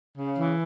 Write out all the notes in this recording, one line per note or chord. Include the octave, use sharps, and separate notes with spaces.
C#3
E3